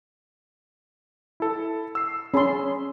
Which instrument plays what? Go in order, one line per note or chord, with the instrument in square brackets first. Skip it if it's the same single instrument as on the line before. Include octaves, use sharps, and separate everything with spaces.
[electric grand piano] E4 A4
E6 C7
[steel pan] C#4 A5 C6 [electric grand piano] G#4 B5